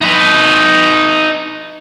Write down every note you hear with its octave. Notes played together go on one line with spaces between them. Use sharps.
D#4 B4